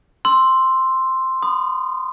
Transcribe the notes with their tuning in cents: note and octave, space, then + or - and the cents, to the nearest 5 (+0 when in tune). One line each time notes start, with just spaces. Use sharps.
C6 +0 E6 +0
B5 +40 D#6 -25